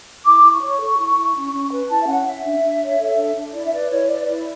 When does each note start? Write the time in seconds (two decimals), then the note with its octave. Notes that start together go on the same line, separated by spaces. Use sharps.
0.25 E4 D6
0.43 E4
0.52 C#6
0.61 C#5
0.80 A4
0.98 E4
1.16 E4
1.35 C#4
1.53 C#4
1.71 B4
1.89 E4 A5
2.01 E5
2.07 C#4 F#5
2.26 C#4 E5
2.44 D4
2.62 D4
2.81 C#5
2.99 A4
3.17 D4
3.36 D4
3.53 E4 D5
3.65 E5
3.72 B4 D5
3.91 E4 C#5
4.09 B4 D5
4.27 E4 D5